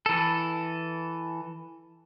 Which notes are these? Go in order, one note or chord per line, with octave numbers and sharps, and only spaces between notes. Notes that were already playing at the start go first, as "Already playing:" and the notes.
E3 A4